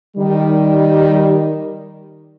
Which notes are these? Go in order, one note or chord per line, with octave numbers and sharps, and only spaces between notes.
D#3 G3